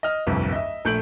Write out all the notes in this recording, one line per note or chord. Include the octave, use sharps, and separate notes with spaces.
D#5 F6
D1 G1 C2 F2
D#5 E5
A#1 A3 G6 D7 F#7